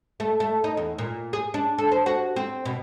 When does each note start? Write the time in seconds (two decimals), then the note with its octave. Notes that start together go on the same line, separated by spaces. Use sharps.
0.20 A3
0.40 A3
0.64 D#4
0.77 E2
0.98 A#2
1.33 G#4
1.54 D4
1.78 A4
1.92 C5
2.06 F#4
2.36 C4
2.65 B2